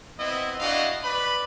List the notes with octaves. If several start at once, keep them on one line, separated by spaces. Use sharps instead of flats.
B3 C4 E4 D#5
D4 E4 F#4 D#5 F5
B4 D5 B5